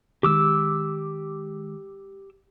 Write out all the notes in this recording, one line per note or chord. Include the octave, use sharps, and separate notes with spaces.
D#3 G#3 G4 D6 E6